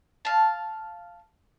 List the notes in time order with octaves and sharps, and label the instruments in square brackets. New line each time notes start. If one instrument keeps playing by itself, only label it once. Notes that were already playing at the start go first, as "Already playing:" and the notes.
[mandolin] F5 A5